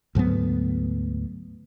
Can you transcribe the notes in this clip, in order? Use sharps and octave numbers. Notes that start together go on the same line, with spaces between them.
D2 G#2 F#3 B3